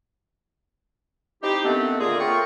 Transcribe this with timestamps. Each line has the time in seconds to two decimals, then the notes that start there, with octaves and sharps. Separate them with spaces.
1.43 C4 D#4 E4 G4
1.65 D#3 A3 B3 C4 D4
2.00 A#2 D3 A#3 F4 G#4
2.20 F#3 A3 F4 A#4 G5 C#6